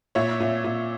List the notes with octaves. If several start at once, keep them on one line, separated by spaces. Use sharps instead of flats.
A#2 C#5 E5
A#2
A#2